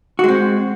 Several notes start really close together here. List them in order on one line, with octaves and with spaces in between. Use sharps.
F#4 G#3 C4